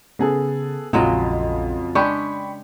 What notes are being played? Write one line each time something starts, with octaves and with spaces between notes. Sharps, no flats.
C#3 B3 G#4 A4
A#1 F2 C#3 F#3 G#3 F4 D#5
G#3 D4 G4 G5 B5 C#6